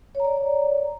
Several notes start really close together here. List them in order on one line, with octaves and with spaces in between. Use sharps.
C#5 A#5 D5